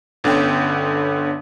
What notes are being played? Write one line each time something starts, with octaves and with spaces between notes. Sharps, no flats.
G1 D3 B3 C#4 G5